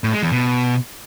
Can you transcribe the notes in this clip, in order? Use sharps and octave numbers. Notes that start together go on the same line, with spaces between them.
A2
G#3
E2
B2